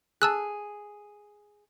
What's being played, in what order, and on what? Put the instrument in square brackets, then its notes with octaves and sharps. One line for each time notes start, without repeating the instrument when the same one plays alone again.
[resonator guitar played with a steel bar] G#4 [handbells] A5 E6 F#6